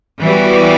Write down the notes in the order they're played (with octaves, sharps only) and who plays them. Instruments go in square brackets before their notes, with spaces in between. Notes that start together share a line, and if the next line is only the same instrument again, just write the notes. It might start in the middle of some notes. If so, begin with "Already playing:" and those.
[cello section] E3 G3 B3 F#4